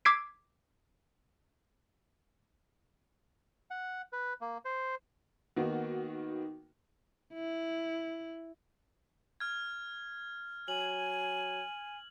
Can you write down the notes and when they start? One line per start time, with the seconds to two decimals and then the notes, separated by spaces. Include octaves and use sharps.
0.05 D6 E6 G#6 B6 C7 D7
3.71 F#5
4.13 B4
4.41 A#3
4.65 C5
5.56 D#3 A#3 B3 F#4
7.34 E4
9.40 F6 G#6
10.68 F#3 G#5 F#7